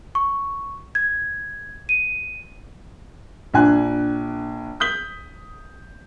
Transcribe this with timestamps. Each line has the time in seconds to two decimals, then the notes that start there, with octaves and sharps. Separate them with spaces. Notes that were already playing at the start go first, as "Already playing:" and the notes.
0.15 C#6
0.95 G#6
1.89 D#7
3.54 A#1 D4 G#5 F#6
4.80 D#6 G6 B6 G7